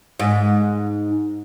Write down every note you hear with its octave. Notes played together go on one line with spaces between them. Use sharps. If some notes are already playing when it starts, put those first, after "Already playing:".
G#2